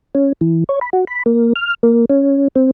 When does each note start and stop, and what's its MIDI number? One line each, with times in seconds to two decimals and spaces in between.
0.15 0.33 61
0.41 0.64 52
0.69 0.79 73
0.81 0.90 83
0.93 1.05 66
1.07 1.23 83
1.26 1.53 58
1.56 1.74 89
1.83 2.05 58
2.10 2.48 61
2.56 2.71 60